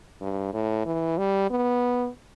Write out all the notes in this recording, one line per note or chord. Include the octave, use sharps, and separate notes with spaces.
G2
A2
E3
G3
B3